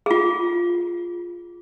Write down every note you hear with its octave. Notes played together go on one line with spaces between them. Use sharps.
F4 G#4